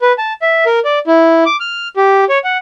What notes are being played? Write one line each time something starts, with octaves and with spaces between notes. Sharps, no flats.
B4
A5
E5
A#4
D5
E4
D6
F6
G4
C#5
F#5